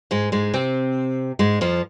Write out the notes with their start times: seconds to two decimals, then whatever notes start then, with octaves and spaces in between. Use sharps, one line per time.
0.11 G#2 G#3
0.32 G#2 G#3
0.54 C3 C4
1.39 G#2 G#3
1.61 F2 F3